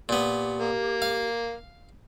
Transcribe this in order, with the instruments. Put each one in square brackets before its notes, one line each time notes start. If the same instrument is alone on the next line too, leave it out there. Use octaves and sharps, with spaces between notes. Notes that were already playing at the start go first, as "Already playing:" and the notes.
[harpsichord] A#2 B3 [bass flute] G4
[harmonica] A#3
[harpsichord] F5